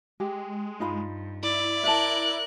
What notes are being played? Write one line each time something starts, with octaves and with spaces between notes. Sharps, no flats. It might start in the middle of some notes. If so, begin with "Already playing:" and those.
G#3 G4
G2 D#4 F4 B5
E4 D5
A#4 E5 A5 F#6